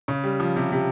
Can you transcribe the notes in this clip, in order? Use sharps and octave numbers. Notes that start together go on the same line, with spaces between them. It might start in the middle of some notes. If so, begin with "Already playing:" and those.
C#3
G3
F3
C3
C3